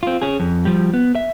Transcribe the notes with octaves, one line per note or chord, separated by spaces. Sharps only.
C4 F4
C#4 G#4
F2
F3 G3
B3
E5